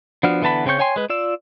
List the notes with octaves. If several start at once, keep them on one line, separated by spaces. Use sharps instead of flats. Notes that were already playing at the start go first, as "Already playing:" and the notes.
F3 B3 D4 F#4 F6
D3 E3 B3 A5 B5
C#3 C4 C#4 C#6 G6
C#5 G5 G#5 C6
G#3 B4
F4 D5 E6